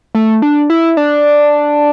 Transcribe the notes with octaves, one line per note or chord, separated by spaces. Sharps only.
A3
D4
E4
D4